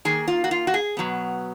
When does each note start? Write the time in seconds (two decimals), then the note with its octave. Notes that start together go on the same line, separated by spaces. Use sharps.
0.05 D#3 A#3 G#4
0.28 F4
0.44 F#4
0.51 F4
0.67 F#4
0.74 G#4
0.97 B2 F#3 B3